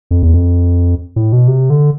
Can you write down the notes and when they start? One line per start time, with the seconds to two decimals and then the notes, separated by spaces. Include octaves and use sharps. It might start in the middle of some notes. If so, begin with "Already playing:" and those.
0.11 F2
0.23 E2
0.34 F2
1.16 A2
1.32 B2
1.48 C3
1.70 D3